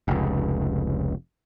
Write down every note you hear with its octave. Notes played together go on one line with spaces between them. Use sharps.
F1 C#2